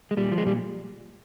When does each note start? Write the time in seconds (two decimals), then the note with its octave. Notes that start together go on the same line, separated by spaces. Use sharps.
0.11 G#3
0.17 A#2 G3
0.32 F3
0.38 G#3
0.46 A#2 G3